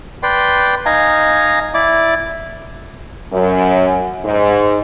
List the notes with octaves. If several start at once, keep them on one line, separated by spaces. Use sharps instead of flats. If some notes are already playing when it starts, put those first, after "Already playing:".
B4 D5 G5 C6
D#4 F5 G#5 A#5
E4 D5 D6
F#2
G#2